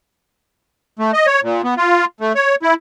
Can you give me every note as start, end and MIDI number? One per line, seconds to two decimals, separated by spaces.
0.99 1.11 57
1.13 1.26 75
1.27 1.40 73
1.43 1.62 46
1.64 1.74 59
1.77 2.05 65
2.21 2.33 57
2.35 2.55 73
2.63 2.74 64